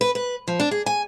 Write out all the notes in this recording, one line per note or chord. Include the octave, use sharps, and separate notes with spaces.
B4
B4
F3
D4
G#4
G#5